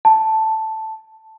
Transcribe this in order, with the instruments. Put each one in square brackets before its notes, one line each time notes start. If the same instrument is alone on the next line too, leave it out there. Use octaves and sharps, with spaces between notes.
[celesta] A5